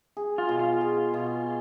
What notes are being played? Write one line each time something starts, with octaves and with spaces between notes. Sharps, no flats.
G#4
F4
B2
F4
G#4
B2